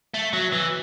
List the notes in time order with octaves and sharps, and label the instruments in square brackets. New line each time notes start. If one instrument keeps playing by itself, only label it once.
[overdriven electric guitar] A3
F#3
E3